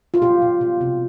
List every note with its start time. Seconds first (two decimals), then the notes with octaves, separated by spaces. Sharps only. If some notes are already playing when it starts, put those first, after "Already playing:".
0.14 F4
0.22 B2 G4
0.42 B2
0.61 B2
0.81 C3